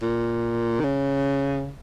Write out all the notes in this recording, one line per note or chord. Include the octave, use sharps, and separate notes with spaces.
A#2
D#3
C#3